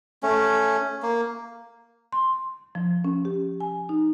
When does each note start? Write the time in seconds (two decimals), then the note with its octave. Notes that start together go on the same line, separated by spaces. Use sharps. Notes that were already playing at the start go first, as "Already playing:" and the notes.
0.23 A3 C#4
1.02 A#3
2.13 C6
2.75 F3
3.04 C#4
3.25 G4
3.60 G#5
3.89 D#4